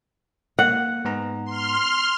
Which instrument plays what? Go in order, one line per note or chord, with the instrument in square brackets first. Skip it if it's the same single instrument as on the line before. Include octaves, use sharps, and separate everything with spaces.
[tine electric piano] A#3 [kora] F#5
[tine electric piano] G#2 B3 A#5
[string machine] C6 F6